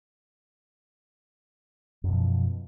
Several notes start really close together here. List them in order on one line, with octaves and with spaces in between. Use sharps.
F#2 B2 F3